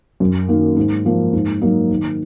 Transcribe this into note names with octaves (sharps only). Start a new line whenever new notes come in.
F#2
D#3 A#3
G#2
F3 A#3
G#2
F#3 A#3 D#4
D#3